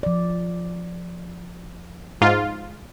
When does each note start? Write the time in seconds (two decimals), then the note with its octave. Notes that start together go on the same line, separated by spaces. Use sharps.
0.03 F3 D5
2.21 G#2 F4